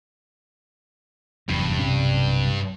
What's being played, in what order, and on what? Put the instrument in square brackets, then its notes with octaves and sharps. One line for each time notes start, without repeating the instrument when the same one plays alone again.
[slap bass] F1 E2 F#3 [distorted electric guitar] G2
[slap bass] B1 C3 C#4